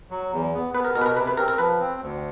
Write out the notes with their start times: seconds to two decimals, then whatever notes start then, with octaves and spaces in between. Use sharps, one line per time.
0.11 F#3
0.32 E2
0.54 B3
0.74 B3 B4
0.85 A#4
0.95 B2 A#4
1.01 B4
1.06 A#4
1.17 C3 B4
1.27 B4
1.37 C4 A#4
1.48 A#4
1.58 F3 B4
1.79 C4
2.01 D2